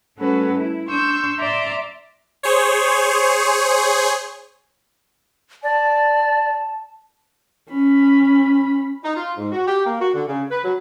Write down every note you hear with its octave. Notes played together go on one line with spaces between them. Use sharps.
G3 A3 C#4 F#4 A4 B4
E4
D4 C6 C#6 E6 G6
D5 E5 A#5 C6 D6
G#4 C5 C#5
D5 A5
C#4 B5
D#4
F4
G#2
F#4
G4
A#3
F#4
D3
C#3
B4
F#3